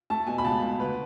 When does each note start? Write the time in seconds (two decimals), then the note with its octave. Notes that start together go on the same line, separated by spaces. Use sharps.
0.10 A3 A5
0.27 B2 G#5
0.38 B5
0.44 C#2 A5
0.62 C#2
0.79 D2 B4